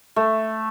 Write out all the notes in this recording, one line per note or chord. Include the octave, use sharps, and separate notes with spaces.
A3